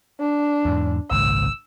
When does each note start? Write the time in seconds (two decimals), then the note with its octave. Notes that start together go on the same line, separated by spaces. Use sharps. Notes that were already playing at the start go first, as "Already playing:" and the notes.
0.20 D4
0.65 E2 G#2
1.11 G#1 C#2 A#2 E6